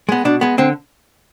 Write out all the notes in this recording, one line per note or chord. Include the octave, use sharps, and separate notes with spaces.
G#3 B3
B2 D4
G#3 B3
D3 C4